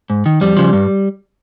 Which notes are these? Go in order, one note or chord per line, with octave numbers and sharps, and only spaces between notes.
G#2
D#3
F2 G3
C#3 F3
G2